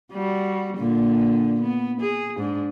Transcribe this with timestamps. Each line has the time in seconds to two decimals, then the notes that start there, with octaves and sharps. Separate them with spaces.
0.12 G3 F#4
0.77 A#2 D3
1.61 B3
2.01 G#4
2.38 G#2 D4